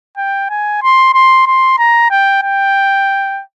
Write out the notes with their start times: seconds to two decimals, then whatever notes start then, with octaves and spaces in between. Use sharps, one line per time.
0.17 G5
0.50 G#5
0.83 C6
1.14 C6
1.46 C6
1.79 A#5
2.11 G5
2.43 G5